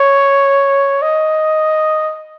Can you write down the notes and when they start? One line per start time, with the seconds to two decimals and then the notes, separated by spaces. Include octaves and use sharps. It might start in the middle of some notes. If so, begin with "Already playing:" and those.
Already playing: C#5
1.02 D#5